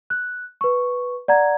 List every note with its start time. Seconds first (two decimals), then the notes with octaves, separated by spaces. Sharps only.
0.10 F#6
0.61 B4 C#6
1.28 D5 F#5 A#5 G#6